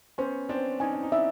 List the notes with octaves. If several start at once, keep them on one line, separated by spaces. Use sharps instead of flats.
B3 C#4 C5
C4 D4 C5
C#4 D#4 G#5
D4
D#4
D4 E4 E5